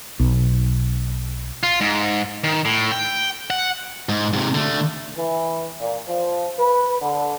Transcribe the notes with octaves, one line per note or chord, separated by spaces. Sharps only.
B1
F4
G#2
D#3
A2
G5
F#5
G#2
G#2 C3
D3 A3
E3
A#2
F3
B4
D3